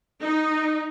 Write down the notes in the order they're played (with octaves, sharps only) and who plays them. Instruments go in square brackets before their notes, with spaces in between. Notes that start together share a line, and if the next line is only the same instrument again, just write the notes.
[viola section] D#4